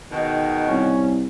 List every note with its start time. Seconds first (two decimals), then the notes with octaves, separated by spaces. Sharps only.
0.11 G#2 B2 D#3
0.68 C2 C#4